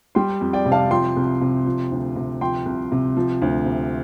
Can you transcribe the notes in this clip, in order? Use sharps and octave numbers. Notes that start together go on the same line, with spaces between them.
G3 G5 C6
F2
D5 G5
C3
F5 A5
F3 G5 C6
C2
C3
F3
D2
C3
F3 G5 C6
C2
C3
F3
D2
C3